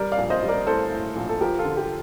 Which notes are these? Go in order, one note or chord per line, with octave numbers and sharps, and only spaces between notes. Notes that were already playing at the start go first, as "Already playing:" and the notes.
Already playing: G3 A#4 D5
D5 F5
A#1
C5 D#5
G3
A#4 D5
A2 A4 C5
A2
A#1
A4
F3 G4 A#4
F4 A4
D3
G4